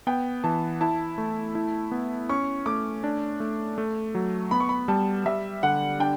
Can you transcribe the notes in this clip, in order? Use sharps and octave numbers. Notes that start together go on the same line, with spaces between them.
B3 G5
E3 A5
E4 A5
A3
E4
B3
C#4 C#6
A3 D6
D4
A3
A3
F#3
B3 B5
C#6
B5
G3 A5
G3 E5
D3 F#5
D4 G5